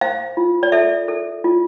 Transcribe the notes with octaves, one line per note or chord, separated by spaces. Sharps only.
C5 F5
F4
D5
A4 E5
A4
F4